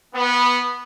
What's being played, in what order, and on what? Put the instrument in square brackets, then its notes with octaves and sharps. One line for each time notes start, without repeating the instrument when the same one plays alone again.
[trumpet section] B3